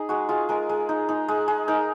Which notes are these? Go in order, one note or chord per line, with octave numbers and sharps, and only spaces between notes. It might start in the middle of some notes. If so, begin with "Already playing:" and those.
Already playing: D#4 G#4
G#3 F#4
G#3 F4
G#3 A#4
G#3
D#4
D#4
G#3
G#3
D#4 A#4